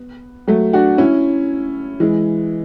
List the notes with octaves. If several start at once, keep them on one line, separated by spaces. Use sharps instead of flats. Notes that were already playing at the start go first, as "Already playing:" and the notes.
Already playing: B3
F#3 A3
D4 F#4
C#4 E4
E3 G#3